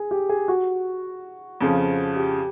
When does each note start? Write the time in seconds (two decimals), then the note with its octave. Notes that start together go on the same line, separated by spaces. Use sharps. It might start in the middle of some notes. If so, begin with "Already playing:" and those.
Already playing: G#4
0.11 G4
0.29 G#4
0.48 F#4
1.61 F2 C#3 F3
2.16 G4